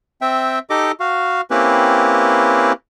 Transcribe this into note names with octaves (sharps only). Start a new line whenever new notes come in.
C4 E5 G5
D#4 G4 A4 D#5 D6
F#4 F5
A#3 C4 C#4 E4 G4 B4